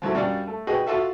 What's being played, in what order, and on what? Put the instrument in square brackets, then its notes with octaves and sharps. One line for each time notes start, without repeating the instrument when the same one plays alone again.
[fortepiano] F3 F#3 A3 E4
F#2 G3 D4 D5 F5
A3
F#4 G#4 B4 D#5 G5
F4 F#4 A4 E5